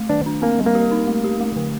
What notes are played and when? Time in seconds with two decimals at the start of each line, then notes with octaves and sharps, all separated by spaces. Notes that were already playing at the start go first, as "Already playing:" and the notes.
Already playing: A3
0.09 D#3 D4
0.26 D4
0.42 A#3 C4
0.59 G3
0.66 A#3
0.75 G4
0.92 D#4
1.07 A3
1.24 G4
1.40 A3
1.56 D3